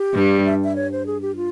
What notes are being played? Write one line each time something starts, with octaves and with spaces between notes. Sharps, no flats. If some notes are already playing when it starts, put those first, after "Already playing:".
Already playing: G4
G2 G3
E5
E5
C#5
C5
G#4
G4
F4